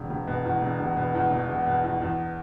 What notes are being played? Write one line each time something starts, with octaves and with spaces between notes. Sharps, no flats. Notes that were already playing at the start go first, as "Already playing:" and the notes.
Already playing: E1
E1
B2
E2
E1
E1
B2
E2
E1
E1
B2
E2
E2